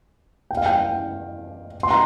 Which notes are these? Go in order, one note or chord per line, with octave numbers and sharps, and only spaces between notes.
G5
F5
G5
C6
A#5